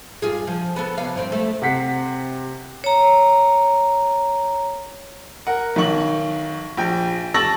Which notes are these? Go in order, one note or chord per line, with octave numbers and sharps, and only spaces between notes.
G2 F4 G#4
F3
B3 A4
C3 C#4 F5
G2 C4
A3
C3 F#5 B6 C7
C#5 A#5
A#4 F#5
B1 D#3 C#6 F#7
A#1 G5
A5 C#6 E6 A6 A#6 F#7